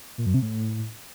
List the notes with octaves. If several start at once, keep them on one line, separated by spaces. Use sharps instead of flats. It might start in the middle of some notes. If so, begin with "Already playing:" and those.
A#2
F#2
C3
A2